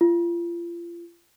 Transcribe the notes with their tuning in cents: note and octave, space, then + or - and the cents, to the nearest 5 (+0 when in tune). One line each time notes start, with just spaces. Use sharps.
F4 -35